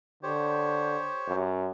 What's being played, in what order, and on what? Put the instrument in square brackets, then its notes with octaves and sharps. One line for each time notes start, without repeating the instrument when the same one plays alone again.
[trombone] D3 [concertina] G4 C5 C#5
[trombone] F#2